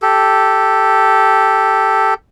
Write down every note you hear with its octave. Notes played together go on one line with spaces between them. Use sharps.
G4 A4